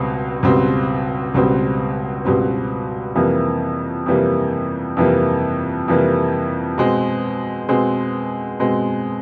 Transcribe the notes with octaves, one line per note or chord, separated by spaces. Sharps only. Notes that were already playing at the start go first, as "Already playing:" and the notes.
Already playing: C#2 B2 G3 C4
C#2 B2 G3 C4
C#2 B2 G3 C4
C#2 B2 G3 C4
F2 C3 E3 G3 A#3
F2 C3 E3 G3 A#3
F2 C3 E3 G3 A#3
F2 C3 E3 G3 A#3
B2 G#3 C4
B2 G#3 C4
B2 G#3 C4